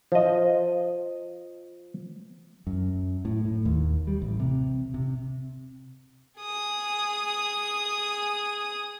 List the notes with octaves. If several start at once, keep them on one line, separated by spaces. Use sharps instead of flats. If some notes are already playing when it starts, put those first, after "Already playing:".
F3 D#5
F#2
A2
A2
D#2
G3
A1
C3
C3
G#4 D#6